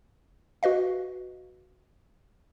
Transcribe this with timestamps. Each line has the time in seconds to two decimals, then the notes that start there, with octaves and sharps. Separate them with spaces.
0.63 F#4 B4 D#5 F5